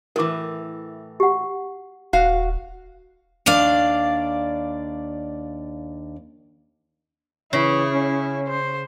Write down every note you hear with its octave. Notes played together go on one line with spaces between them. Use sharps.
A2 E3 A#4 D6
G4 F#5
D#1 F#4 F5
D#2 D4 D5 F5
C#3 E3 E4
C#4
C5